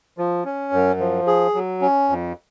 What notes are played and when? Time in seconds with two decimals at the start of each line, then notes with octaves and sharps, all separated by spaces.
0.18 F3
0.45 C#4
0.73 F#2
1.00 F3
1.27 G#4
1.55 F#3
1.82 C#4
2.09 F2